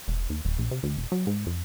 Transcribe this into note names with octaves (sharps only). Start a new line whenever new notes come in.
E1
D#2
D#1
A#1
C3
D2
E1
F#3
G#2
F2